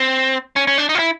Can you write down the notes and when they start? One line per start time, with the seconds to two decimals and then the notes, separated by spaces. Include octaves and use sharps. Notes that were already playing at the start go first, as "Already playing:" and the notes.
Already playing: C4
0.56 C#4
0.67 C#4
0.78 D4
0.89 D#4
0.95 F4
0.99 E4